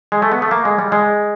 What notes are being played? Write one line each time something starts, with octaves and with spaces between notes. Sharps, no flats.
G#3
A3
B3
A3
A#3
G#3
G3
G#3